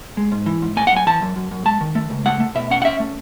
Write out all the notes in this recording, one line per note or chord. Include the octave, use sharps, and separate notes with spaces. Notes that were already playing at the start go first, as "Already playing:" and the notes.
G#3
G#2
E3
G#2
A3 G#5
F#5
F#2 G#5
E3 A5
F#2
F#2
F#2
G#3 A5
D#3
A3
C#2
A3 F#5
A3
B2 E5
C#4 F#5
F#5
C#4 E5
A3